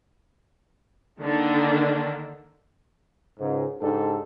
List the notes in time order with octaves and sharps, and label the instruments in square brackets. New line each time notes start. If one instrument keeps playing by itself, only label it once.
[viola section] D3 D#3 A#3 D4
[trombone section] C#2 G#2
C#2 G#2 D4 G4 A4